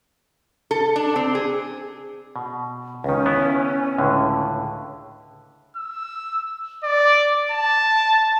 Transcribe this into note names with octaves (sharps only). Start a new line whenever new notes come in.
A4
D4
C4
G#4
B2
C#2 D#3 C#4
B3 E4
C#2 A2 D3
E6
D5
A5